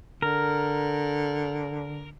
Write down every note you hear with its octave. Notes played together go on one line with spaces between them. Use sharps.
D3 A#4